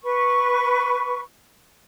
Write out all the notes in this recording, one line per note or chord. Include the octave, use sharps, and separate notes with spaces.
B4 C#6